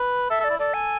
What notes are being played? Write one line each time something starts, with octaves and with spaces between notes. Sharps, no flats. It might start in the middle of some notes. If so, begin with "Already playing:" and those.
Already playing: B4
A4 E5
A4 D5
E4
A4 D5
G#5